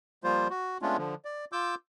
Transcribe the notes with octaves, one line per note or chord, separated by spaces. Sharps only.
F3 G3 A#3 F4 C5
F#4
G#3 A3 B3 C#4 D4 F4
D3 F3
D5
F4 D6 E6 G6